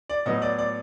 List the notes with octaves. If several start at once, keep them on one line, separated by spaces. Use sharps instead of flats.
D5
A2 F#3 B3 D#5
D5
D5